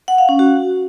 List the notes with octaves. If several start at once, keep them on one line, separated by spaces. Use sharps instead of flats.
F#5
F5
C#4
F#4